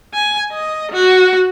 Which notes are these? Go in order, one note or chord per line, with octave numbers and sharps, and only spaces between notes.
G#5
D#5
F#4